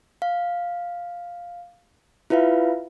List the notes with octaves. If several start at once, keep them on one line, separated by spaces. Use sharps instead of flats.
F5
E4 F4 B4 E5 F5